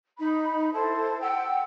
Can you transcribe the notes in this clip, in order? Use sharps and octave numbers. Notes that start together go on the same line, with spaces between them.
D#4 B5
E4 A4 C5 A5
F#5 G5 E6